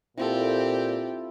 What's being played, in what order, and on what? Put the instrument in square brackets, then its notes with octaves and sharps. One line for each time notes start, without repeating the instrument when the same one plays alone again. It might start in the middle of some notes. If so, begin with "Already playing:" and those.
[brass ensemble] A#2 [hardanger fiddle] C4 G4 [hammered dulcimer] E4 F4 A4